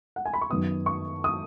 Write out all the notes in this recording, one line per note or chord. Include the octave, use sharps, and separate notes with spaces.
F#5
G#5
B5
C#6
F#2 D#3 B3 D#6
C#6
D#6